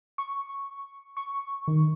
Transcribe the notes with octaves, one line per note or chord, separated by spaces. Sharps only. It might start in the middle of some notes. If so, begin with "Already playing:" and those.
C#6
C#6
D#3